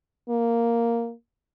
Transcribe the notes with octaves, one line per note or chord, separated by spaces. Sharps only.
A#3